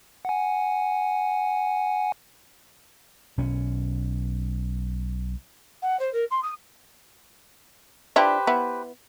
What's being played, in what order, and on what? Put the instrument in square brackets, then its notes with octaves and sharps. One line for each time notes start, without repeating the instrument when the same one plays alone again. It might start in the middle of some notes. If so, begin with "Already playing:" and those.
[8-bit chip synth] F#5 G#5
[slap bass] B1 C#4
[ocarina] F#5
C5
A#4
C6
D#6
[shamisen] D4 E4 F4 [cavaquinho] G4 B4 C5
[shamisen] B3 E4